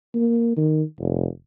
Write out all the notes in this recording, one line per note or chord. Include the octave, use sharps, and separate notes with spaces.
A#3
D#3
F1